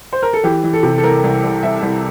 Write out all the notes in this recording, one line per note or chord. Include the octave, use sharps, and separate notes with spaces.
C5
A#4
A4
E3 G4
E3
A4
C3
A4
C2 A#4
C2
C2
C2 E5
C2